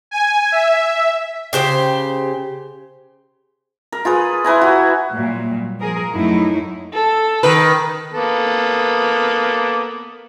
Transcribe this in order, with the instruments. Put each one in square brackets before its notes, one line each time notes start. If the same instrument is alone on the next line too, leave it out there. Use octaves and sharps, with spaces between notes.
[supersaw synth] G#5
E5
[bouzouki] C#3 G4 C5
[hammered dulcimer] A#4
F4 G#4 B4
E4 B4 G#5 A#5
F#4
[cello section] A#2 F#3 G3
F3 G#4 A#4
F#2 F#3 A3 D#4 E4
[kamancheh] A4
[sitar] D#3 B4
[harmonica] A#3 B3 A4